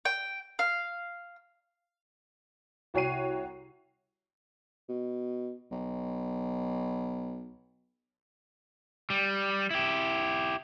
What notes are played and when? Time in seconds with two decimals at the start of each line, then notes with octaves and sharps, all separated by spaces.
0.05 G5
0.59 F5
2.94 C2 F#4 C#5 G5 C7 D#7
4.89 B2
5.71 B1
9.10 G3
9.71 E4 G4